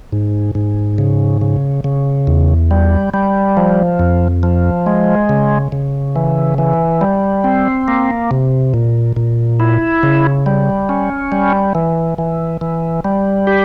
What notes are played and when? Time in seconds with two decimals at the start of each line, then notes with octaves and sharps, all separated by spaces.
0.12 G#2
0.55 G#2
0.98 C#3
1.41 C#3
1.84 C#3
2.27 E2
2.71 G3
3.14 G3
3.57 F3
3.99 F2
4.43 F3
4.86 G#3
5.29 C#3
5.72 C#3
6.16 E3
6.58 E3
7.01 G3
7.44 C4
7.88 A#3
8.31 C3
8.74 A#2
9.16 A#2
9.60 E4
10.03 C#3
10.46 G3
10.89 C#4
11.32 G3
11.75 E3
12.18 E3
12.61 E3
13.04 G3
13.47 G4